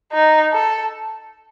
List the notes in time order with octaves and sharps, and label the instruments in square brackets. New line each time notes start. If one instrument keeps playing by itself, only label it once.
[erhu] D#4
A4